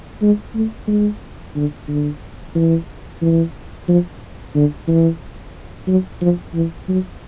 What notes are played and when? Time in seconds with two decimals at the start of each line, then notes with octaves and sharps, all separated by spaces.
0.21 G#3
0.55 A3
0.87 G#3
1.55 D3
1.88 D3
2.55 E3
3.22 E3
3.88 F3
4.55 D3
4.88 E3
5.87 F#3
6.21 F3
6.54 E3
6.88 F#3